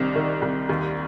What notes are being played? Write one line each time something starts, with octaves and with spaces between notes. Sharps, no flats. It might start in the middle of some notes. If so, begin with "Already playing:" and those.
Already playing: C2 D#3 C4 D4
D#3
C2
D#2